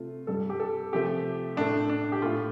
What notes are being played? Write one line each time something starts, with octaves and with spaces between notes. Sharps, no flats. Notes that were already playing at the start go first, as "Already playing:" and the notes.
Already playing: C3 A3 F4
G2 G3 A4
G4
A4
C3 F3 A3 G4
A2 A3 D4
D4
G4
A2 A3 F4